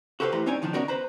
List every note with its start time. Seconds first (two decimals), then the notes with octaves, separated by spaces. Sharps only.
0.20 F#4 G4 A4 B4 C5 F5
0.32 A2 E3 G4 B4 A#5 C6
0.46 C4 C#4 D#4 C#5 D5 G#5
0.62 B1 D#3 F3 D4
0.73 D#3 B3 C#4 F#4 A#4 D5
0.88 B4 C5 A#5